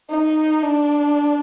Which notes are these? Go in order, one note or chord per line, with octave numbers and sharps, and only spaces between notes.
D#4
D4